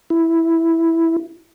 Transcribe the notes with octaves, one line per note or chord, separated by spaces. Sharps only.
E4